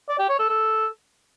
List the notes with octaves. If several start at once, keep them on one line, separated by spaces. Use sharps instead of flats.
D5
G4
C#5
A4
A4